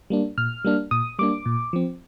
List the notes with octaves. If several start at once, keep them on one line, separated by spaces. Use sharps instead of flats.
G3 A#3 D4
A#2 F6
G3 A#3 D4
A#2 D#6
G3 A#3 D4 D6
A#2
F3 C4